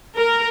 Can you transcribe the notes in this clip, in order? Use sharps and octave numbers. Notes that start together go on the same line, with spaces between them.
A#4